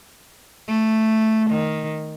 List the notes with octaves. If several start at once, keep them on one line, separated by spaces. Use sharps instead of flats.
A3
D#3